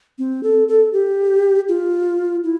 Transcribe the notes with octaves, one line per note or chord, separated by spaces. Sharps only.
C4
A4
A4
G4
F4
E4